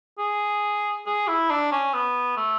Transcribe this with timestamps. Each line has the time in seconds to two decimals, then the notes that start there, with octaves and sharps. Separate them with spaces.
0.19 G#4
1.06 G#4
1.28 E4
1.50 D4
1.72 C#4
1.94 B3
2.37 A3